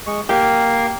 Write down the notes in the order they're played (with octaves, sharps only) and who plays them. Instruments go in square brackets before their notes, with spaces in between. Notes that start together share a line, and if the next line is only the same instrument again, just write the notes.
[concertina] G#3 C#6
[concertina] A#3 A#4 F5 [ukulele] G4